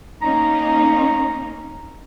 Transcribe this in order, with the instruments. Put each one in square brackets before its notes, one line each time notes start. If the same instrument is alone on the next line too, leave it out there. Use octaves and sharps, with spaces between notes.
[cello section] A#3 C#4 D#4 [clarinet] A#5